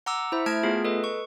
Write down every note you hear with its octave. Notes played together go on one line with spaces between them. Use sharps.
F#5 A#5 D6 E6
E4 C5 E5
A3 A5 F6 G#6 D7
A3 B3 F4 G#4
A4 B4 D#5
C#6